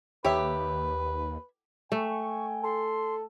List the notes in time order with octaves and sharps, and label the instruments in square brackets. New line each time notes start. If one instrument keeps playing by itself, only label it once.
[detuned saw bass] D#2 [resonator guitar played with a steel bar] G4 [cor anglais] B4 [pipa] C#5 E5
[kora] A3 [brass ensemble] G5 G#5 [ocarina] C#6
[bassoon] A4 [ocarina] C6